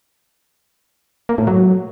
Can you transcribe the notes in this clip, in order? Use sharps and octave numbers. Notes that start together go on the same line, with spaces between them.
A#3
A2
F#3